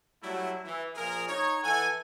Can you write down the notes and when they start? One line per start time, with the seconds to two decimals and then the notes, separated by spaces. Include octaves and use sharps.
0.23 F#3 G3 A3 E4
0.65 E3
0.95 A#2 F3 G#4 A#4
1.28 D#4 C#5
1.63 E3 A4 F#5 G#5